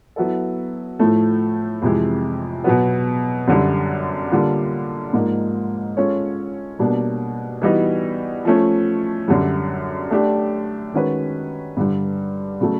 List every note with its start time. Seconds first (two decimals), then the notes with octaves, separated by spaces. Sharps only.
0.16 F#3 B3 E4 A4
0.99 A2 F3 A3
1.82 F2 C3 E3 G#3
2.64 B2 F#3 B3
3.48 F#2 D3 G3
4.31 D3 G3 A#3 D4 F4
5.13 G#2 F3 A#3 D#4
5.97 G#3 C#4 F4 A4 C#5
6.79 B2 G3 A#3 D4
7.62 E3 G3 B3 D#4 F#4
8.45 F3 A3 C#4
9.28 F#2 D3 G3
10.11 A3 D4 G4
10.94 D#3 G#3 C#4 F#4 B4
11.77 G2 D3 G3
12.61 C#3 F#3 A3